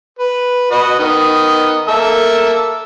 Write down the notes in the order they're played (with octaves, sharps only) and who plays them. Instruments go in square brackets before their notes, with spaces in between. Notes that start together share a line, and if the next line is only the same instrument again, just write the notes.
[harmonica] B4
F#4 B4 D#5
D#3 B3 D#5
A#3 A4 E5